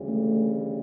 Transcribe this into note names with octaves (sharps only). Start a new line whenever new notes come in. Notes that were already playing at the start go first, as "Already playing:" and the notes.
Already playing: D2 C#3 E3 G3
A3